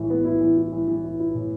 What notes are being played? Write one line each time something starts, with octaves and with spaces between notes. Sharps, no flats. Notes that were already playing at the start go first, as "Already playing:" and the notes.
Already playing: A2 E3 E4
B3
E4
E3
E4
E3
E3
E4
E4
A2